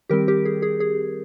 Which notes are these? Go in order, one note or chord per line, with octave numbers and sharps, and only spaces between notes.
D#3 G3 C4 G4 A#4
G4 A#4
G#4
G#4
G#4